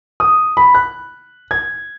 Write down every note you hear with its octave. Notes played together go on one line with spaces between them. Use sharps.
D#6
B5
F#6
G#6